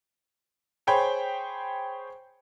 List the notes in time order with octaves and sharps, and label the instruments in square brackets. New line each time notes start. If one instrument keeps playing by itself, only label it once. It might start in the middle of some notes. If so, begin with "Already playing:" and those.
[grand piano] G#4 C5 C#5 G5 B5